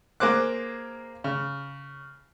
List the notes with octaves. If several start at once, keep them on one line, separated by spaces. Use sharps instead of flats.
A#3 G#4 C5 D6 F#6
C#3